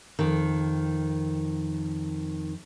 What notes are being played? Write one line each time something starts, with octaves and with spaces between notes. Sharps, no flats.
F2 D#3